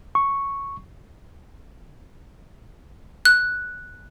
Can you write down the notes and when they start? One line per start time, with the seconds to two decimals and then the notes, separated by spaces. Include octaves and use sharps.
0.15 C#6
3.25 F#6